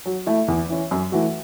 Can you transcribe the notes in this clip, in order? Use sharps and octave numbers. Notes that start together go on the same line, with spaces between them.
F#3
A3 E4
E2
E3 C#4
F#2
E3 A3 F#4